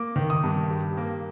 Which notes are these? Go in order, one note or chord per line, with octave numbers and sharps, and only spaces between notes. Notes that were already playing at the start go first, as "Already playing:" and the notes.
Already playing: A#3 D6
D#3
D#6
G2
G3
A#3